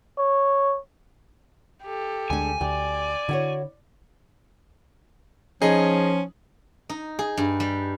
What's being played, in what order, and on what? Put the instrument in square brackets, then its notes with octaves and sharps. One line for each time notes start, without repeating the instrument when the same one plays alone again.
[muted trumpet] C#5
[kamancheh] G4 A4
[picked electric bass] D2 [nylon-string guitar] G#3 D4 [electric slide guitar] G#5
[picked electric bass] D2 [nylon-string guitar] G4 [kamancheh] D5
[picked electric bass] D3 [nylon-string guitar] E4 F#4 C#5
[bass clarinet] F3 [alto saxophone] C#4 [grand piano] D#4 G#4
[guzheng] D#4
G#4
G2
G3